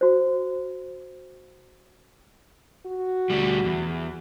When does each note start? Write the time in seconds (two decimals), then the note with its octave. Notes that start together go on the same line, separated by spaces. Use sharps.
0.01 F#4 C5
2.86 F#4
3.30 D2 G3
3.64 E2